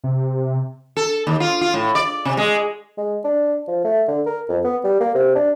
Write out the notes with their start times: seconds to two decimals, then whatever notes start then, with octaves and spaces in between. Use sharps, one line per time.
0.04 C3
0.97 A4
1.27 D#2
1.40 F4
1.61 F4
1.74 A2
1.95 D5
2.25 C3
2.37 G#3
2.98 G#3
3.25 D4
3.68 F3
3.85 A3
4.08 D3
4.26 A#4
4.49 F2
4.64 B3
4.84 G3
5.00 A#3
5.15 C3
5.35 D4